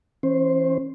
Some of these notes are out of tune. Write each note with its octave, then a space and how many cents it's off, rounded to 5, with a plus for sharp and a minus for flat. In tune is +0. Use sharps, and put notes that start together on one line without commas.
E3 +0 C#4 -35 C5 +0